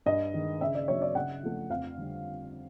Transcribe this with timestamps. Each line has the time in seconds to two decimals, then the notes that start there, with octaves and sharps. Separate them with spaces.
0.06 G2 D#5
0.34 D#3 G#3
0.61 C#3 E5
0.75 D5
0.88 F#3 B3 C#5
1.02 D5
1.15 C#3 F#5
1.43 F3 A3
1.70 F2 F5
1.97 D3 G3